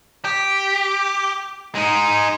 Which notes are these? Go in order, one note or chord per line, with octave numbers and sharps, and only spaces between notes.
G4
G#3 D#4